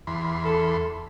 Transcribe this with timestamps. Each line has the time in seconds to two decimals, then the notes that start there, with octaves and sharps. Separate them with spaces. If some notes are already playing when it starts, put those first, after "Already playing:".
0.07 E2 B5 C6
0.45 A4